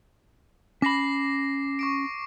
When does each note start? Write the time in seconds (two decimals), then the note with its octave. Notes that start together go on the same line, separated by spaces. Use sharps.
0.82 C#4 B5 D6 A#6 C7
1.79 C#6 D6 D7